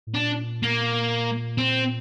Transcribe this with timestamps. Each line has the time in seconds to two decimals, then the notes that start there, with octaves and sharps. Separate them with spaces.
0.07 A2
0.15 A#2 D4
0.63 A#3
1.58 C4